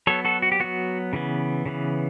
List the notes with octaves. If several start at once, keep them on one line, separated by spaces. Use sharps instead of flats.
F#3 B3 A4 C#5
F#4 A4
F#4
G4
F#3 B3 F#4
C#3 E3 B3
C#3 E3 B3